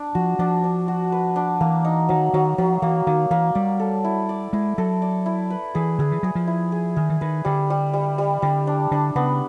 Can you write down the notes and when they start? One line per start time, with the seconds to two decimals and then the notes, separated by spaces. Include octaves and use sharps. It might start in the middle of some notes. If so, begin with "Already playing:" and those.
Already playing: D4
0.15 F3 F#4
0.39 F3 D4
0.64 D4
0.88 F#4
1.12 B4
1.36 D4
1.61 E3 A#3
1.85 D#4
2.09 D#3 F#3
2.34 D#3 F#3
2.58 F3 F#3
2.82 E3 A#3
3.07 D#3 A#3
3.31 E3 A#3
3.55 G3 D5
3.80 A4
4.04 E4
4.29 D5
4.53 G#3 E4
4.78 F#3 A4
5.02 D5
5.26 E4
5.50 B4
5.75 E3 G#4
5.99 D3 G#4
6.12 E3
6.23 F#3 G#4
6.35 F3
6.48 E4
6.72 G#4
6.96 D#3 G#4
7.09 E3
7.21 D#3 B4
7.45 D3 G3
7.70 G3
7.94 G3
8.18 G3
8.42 D3 G3
8.67 D4
8.91 D3 D4
9.16 C#3 B3